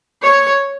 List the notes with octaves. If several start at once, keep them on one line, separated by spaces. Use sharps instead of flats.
C#5